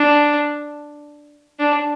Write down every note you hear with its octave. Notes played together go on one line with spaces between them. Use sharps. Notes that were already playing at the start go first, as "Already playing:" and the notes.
Already playing: D4
D4